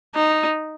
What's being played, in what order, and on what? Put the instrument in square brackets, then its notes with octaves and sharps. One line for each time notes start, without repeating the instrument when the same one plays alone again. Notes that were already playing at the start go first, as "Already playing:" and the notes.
[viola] D#4